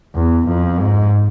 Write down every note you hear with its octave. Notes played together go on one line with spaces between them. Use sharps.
E2
F2
G#2